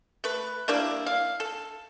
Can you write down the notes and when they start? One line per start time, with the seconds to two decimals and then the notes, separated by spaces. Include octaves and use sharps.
0.24 A3 B4
0.68 G3 A#3 D4 E4
1.06 F5
1.40 A4